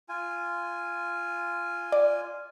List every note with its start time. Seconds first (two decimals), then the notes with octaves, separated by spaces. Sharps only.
0.09 F4 G#5
1.92 D5